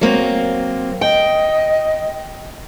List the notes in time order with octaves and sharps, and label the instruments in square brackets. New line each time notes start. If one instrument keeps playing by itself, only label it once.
[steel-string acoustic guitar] F#3 A#3 C4
[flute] D#5 [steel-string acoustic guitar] G5